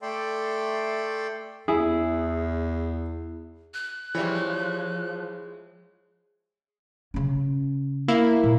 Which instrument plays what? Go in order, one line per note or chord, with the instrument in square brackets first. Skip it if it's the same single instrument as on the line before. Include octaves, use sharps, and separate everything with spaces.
[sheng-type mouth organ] A3 A4 D5 E5 G5 C6
[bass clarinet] E2 [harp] E4 [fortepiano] G#4
[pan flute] F#6
[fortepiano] E3 G3 [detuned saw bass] F3 [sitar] G#3 C#5
[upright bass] C#3 C#4
[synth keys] A#3 E4
[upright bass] A#2